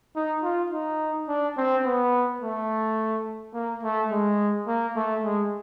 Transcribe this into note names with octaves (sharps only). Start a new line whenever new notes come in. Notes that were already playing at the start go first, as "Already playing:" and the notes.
D#4
F4
D#4
D4
C4
B3
A3
A#3
A3
G#3
A#3
A3
G#3